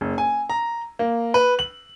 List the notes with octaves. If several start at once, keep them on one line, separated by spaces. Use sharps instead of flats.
F#1
G#5
A#5
A#3
B4
F#7